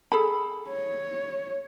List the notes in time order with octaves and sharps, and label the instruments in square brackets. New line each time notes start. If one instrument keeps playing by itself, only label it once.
[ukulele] G#4 A4 B5
[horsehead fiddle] C#5